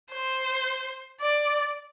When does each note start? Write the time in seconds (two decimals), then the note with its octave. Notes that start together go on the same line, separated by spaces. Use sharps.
0.12 C5
1.20 D5